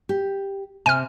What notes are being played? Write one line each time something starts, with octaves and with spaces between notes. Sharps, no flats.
G4
C3 G#5 F6